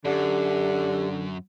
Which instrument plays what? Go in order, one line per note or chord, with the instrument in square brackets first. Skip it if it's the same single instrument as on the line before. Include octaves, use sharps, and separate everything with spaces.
[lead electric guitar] F#2 [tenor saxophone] D3 [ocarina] G4